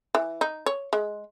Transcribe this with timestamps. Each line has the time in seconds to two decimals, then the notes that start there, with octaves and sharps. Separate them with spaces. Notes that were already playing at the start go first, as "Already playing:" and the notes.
0.15 E3
0.41 D#4
0.66 C#5
0.93 G#3